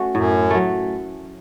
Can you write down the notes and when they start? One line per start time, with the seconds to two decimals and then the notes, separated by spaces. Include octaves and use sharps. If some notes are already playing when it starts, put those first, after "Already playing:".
Already playing: A3 C#4 F#4
0.15 F#2 A2
0.50 F#3 A3